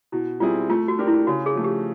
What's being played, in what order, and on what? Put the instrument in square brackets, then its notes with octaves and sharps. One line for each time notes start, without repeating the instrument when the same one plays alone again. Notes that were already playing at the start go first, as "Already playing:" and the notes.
[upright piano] B2 [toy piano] E4
[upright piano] G3 C4 E4 G#4 [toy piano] F4
[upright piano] A3 [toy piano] F4
[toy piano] F#4
[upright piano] D4 G4 A#4
[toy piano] E4
[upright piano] C#3 [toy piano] F#4
[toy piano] G#4
[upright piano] F3 A3
[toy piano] G4